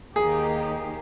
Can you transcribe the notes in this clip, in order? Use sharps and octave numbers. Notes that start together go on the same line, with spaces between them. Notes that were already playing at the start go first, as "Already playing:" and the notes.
D#2 D#3 A#3 D#4 G4 G#4